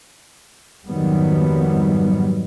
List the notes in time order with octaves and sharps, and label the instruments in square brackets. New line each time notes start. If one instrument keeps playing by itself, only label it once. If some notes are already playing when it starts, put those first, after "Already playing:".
[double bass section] F2 G#2 D#3 F#3 G3 B3